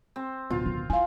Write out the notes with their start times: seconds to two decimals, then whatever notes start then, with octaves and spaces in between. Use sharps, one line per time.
0.16 C4
0.50 D1 B2 F4
0.66 D#3
0.90 E4 F5 G#5